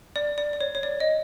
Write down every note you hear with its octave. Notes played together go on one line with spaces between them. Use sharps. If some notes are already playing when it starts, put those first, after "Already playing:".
D5
D5
D5
C#5
C#5
D5
D#5